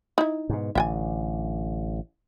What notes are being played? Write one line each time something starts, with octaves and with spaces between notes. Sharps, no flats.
D#4 E4
G#2 B2
A1 D3 E5 G5 G#5